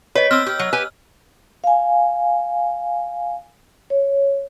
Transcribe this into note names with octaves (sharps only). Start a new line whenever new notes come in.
B4 C#5 D#5
C4 E6 F6
G4
F#3
G4 B4 G#5
F5 G#5
C#5